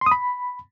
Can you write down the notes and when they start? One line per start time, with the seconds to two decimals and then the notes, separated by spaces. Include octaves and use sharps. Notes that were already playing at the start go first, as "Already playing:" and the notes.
0.01 C6
0.06 D#6
0.12 B5